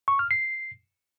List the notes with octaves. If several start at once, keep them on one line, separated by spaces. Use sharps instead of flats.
C#6
F6
C7